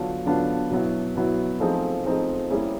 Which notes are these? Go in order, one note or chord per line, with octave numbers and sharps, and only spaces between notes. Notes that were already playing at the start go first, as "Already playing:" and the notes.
Already playing: D3 F#3 B3 D4 F4
D3 F#3 B3 D4 F4
B2 F#3 B3 E4
B2 F#3 B3 E4
F3 A3 C4 D#4 G#4
F3 A3 C4 D#4 G#4
G3 A#3 C#4 E4 G#4